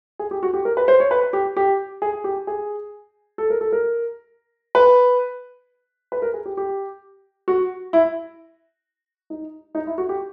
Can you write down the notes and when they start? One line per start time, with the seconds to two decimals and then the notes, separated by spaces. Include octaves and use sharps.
0.19 G#4
0.31 G4
0.43 F#4
0.54 G4
0.65 A#4
0.77 B4
0.88 C5
1.00 C#5
1.11 B4
1.33 G4
1.57 G4
2.02 G#4
2.24 G4
2.47 G#4
3.38 A4
3.50 A#4
3.61 A4
3.72 A#4
4.75 B4
6.12 B4
6.22 A#4
6.34 G#4
6.46 G4
6.57 G4
7.48 F#4
7.93 E4
9.30 D#4
9.75 D#4
9.87 E4
9.98 F#4
10.09 G4